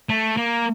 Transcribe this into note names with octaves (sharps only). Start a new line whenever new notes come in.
A3
A#3